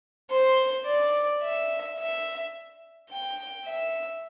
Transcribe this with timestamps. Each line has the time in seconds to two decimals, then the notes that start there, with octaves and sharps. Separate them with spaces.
0.31 C5
0.86 D5
1.42 E5
1.98 E5
3.10 G5
3.65 E5